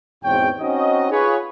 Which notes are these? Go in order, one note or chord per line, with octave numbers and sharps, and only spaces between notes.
E2 G#2 B2 C4 C#5 G5
C4 C#4 D#4 F#4 D#5
F4 G#4 B4 C#5